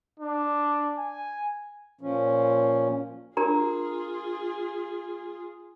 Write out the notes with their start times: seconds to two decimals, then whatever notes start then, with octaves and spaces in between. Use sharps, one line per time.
0.20 D4
0.98 G#5
2.01 A#2 F3 C#4
3.37 D4 F4 G#4 A#4 A#5